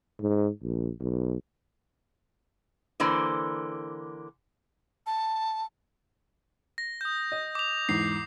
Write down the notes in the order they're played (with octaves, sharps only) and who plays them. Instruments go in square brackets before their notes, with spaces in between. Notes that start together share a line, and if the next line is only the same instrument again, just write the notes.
[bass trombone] G#2
A#1
B1
[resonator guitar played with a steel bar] D3 E3 A#3 C5
[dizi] A5
[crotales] A#6
D#6 G6
[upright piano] D#5
[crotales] D6 F7
[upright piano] E2 G#2 [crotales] C7